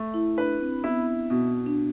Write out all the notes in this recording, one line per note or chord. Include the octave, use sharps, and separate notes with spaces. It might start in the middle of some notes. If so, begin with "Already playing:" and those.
Already playing: A3
E4
D4 B4
C4
B3 E4
B2
D4